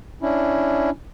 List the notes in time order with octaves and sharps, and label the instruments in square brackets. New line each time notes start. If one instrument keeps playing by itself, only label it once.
[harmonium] C#4 D4 E4